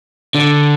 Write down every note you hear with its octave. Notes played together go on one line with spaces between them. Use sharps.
D3